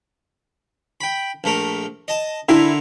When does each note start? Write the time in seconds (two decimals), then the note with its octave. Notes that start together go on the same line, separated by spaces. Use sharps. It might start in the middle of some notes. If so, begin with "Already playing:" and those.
1.01 G5 B5
1.44 A#1 A3 A#4
2.08 D#5 A5
2.49 D3 E4 A#4 C6